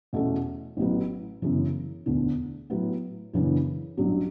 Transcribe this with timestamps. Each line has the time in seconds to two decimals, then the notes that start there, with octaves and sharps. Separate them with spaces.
0.13 E2 B2 A3 C#4
0.77 A1 A2 F#3 B3
1.42 G1 F#2 C#3 E3
2.06 E1 D2 D3
2.70 A2 F#3 B3 E4
3.33 F#2 C#3 E3 B3 D4
3.97 A1 G2 F#3